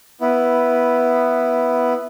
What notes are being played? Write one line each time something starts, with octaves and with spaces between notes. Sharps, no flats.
B3 E4